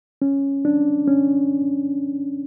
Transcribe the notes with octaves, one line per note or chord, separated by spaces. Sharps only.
C#4
D4
C#4